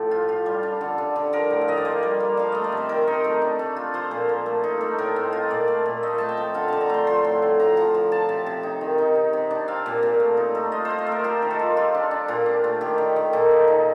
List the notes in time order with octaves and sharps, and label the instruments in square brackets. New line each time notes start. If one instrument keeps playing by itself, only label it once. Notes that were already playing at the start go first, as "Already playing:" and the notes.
Already playing: [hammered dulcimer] A2 F3 G4
F4
F4
G3
D4
D3
D3
D3
F3 A#4
A2
F5
F3 D#5
D5
A#3 C5
G3
G3
F3 F5
A3 D#5
D5
C3 C5
D#3 A#4
D#4
A3
D4
A3
F4
F3 C5
A#2
A#3
A3
D#4
A3
A2 A#4
C4
F4
A#2 D5
A3
A#2
A3 D#5
A3 A5
G5
F3
D3 F5
D3 A5
A#5
A3 C6
F3 C6
A2
A2
F3 A#5
F3
F3
F3 A5
C3
C3
D#4
D#3
D#4
C3
C3
D4
C4 F5
A#2
A#2
A3
D#4
A3
F4 D#5
C5
F4
C5
A3
A#4
F4 G4
D#3
A4
F4
F4 G4
D4
D4
A#2 F4
D4
A3
D#3 G4
D#3
D#3
A#2 A4
D#4
D#4